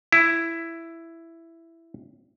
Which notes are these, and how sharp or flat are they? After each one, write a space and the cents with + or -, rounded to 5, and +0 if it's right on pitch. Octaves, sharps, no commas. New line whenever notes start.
E4 +10